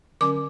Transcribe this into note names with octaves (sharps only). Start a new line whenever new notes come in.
D3 F#3 C#4 D6